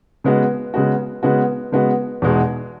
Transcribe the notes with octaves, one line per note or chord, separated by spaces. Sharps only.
C#3 G#3 B3 F#4
C#3 G#3 B3 F#4
C#3 G#3 B3 F#4
C#3 G#3 B3 F#4
E2 B2 G#3 D#4 F#4